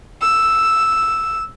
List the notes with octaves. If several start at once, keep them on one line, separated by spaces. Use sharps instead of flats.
E6